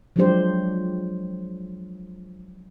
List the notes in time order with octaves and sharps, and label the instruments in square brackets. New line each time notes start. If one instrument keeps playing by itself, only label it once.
[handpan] F3 F#3 G#3 D4 G4 C5